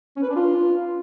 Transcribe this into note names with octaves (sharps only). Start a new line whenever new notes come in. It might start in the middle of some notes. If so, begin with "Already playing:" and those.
C#4
B4
D4
F4